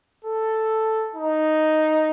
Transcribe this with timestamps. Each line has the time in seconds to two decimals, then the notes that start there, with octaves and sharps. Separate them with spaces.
0.25 A4
1.15 D#4